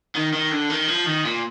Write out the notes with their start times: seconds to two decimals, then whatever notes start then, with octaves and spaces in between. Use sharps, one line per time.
0.15 D#3
0.33 D#3
0.51 D3
0.70 D#3
0.88 F3
1.06 D#3
1.25 A#2